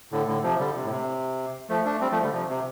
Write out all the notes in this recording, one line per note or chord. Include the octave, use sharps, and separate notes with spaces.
A2 D3
A2 D3
C3 F3
D3 G3
C3
A2
C3
F3 A3
A3 D4
G3 C4
F3 A3
D3 G3
C3 F3
C3